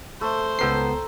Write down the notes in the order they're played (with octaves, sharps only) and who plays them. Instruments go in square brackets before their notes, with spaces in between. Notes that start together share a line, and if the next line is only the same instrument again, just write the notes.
[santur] A3 [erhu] C5
[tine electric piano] C#2 B3 C7 [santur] A4 G5 A#5